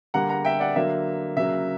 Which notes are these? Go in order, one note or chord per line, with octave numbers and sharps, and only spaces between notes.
D3 G3 A#3 F#5 A#5
F#5 A#5
E5 G5
D5 F#5
D3 F#3 A#3 E5
C#3 F#3 A#3 E5